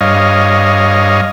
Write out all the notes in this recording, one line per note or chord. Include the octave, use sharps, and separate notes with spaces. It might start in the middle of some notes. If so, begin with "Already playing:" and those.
G2 C#5 D#5 F5